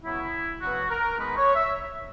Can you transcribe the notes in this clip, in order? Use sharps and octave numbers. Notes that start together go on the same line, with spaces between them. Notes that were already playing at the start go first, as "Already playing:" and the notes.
C#3 F#3 B3 E4
C#3 F#3 B3 F#4
A#4
D#3 G#3 B3 D#4 B4
C#5
E5